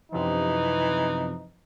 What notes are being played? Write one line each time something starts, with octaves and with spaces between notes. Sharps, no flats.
F#2 C3 E3 F3 D#4